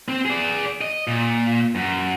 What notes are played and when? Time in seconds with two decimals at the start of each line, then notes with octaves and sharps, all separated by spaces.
0.08 C4
0.25 G#4 D5
0.81 D#5
1.07 A#2
1.75 F#2